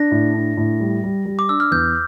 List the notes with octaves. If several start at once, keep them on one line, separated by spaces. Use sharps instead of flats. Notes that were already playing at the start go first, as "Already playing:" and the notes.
Already playing: D4 A#6
A2
D4
A2
G3
G3
G3
D6
D4 E6
F6
E2 G6